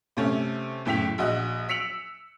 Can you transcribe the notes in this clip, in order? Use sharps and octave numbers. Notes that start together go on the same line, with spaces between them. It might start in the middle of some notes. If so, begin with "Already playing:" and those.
C3 A3 C#4
F#1 A2 G5 B6 F7
A#1 F#4 D#5 E5 F#6
E6 B6 C#7 D7 F7 F#7